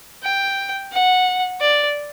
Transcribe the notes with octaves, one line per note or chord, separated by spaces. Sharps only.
G5
F#5
D5